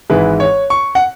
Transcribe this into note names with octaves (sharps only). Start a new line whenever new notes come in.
G#1 G#2 E3 G#3 E4 B4
C#5
C#6
F#5